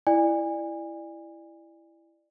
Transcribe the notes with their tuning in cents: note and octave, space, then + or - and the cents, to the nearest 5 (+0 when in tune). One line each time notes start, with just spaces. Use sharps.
E4 +10 D5 +25 G#5 -30